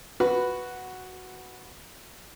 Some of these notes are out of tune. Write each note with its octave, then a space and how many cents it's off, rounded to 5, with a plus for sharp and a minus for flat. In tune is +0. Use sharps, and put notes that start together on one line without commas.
F#4 +0 B4 +0